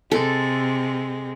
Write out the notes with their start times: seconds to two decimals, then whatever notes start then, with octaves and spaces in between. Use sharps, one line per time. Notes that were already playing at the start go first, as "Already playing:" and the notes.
0.11 C3 G#3 A4